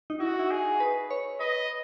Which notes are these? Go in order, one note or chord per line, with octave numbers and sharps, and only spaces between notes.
D#4
E4 F#4
E4
D#4 G#4
B4
C#5
B4 D#5